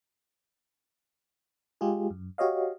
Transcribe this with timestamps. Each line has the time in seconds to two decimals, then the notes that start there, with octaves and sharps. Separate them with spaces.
1.81 G#3 F4 G4 G#4
2.10 F#2
2.38 F#4 G4 C#5 D#5 F5